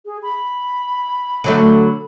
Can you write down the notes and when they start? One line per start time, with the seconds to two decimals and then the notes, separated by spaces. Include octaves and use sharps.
0.06 G#4
0.23 B5
1.44 D3 F#3 A3